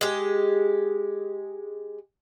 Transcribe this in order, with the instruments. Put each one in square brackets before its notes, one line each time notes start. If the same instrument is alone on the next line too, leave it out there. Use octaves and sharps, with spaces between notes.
[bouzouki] G#3 G4